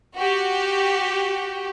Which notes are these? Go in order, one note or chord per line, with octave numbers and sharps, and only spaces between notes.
F#4 G4